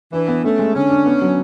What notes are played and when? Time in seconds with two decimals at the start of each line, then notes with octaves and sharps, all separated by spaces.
0.13 E3 D4
0.28 B3
0.44 A3 C#4
0.59 G#3
0.74 D3 C#4
0.90 D4
1.06 B3
1.22 F#3